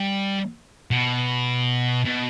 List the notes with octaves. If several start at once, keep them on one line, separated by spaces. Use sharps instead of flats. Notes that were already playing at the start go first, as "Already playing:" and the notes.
Already playing: G3
B2
B2